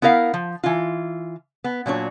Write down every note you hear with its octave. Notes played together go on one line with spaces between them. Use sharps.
B3 E4 A#4 D5 F5 F#5
F3
E3 F4
B3
A#2 F#3 D4 C#5